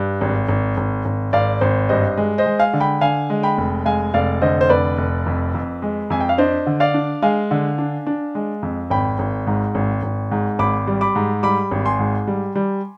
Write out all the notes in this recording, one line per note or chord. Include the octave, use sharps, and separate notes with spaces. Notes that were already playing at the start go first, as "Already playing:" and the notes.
Already playing: G2
G#1
G#1
G#1
G#1
G#1 D5 F5
G#1 C5
G2 C5 D#5
G#3
C5 D#5
G#3
F5 G#5
D3
G5 B5
D3 F5 G#5
G#3
G5 B5
F1
G#3 F5 G#5
F1 D5 F5
D3 C5 D#5
C5
F1 B4 D5
F1
F2
F2
G#3
F2 G#5
G5
F5
D4 C5 D#5
D3
D5 F5
D4
G#3 F5 G#5
D3
D4
D4
G#3
F2
G#1 G5 B5
G#1
G#2
G#1
G#1
G#2
G#1 B5 D6
G3
B5 D6
G#2
G3 B5 D6
G#1
G#5 C6
G#2
G3
G3